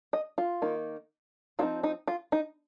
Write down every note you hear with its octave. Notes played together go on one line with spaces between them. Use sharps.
D#5
F4
D#3 A#3 D#4
F3 C4 D#4 F4
D#4
F4
D#4